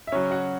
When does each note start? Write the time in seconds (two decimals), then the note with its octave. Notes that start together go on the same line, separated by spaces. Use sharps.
0.07 E5
0.12 C#3 F#3 C#4 C#5
0.31 F#4 F#5